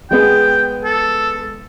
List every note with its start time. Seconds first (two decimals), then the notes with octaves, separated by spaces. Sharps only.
0.11 G#3 B3 G#4 G5
0.84 A4